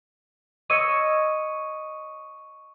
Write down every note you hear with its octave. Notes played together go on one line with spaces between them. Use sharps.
C#5 D#5 C#6 E6 C#7 D#7